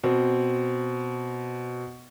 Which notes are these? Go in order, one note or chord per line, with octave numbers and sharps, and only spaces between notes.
B2 C4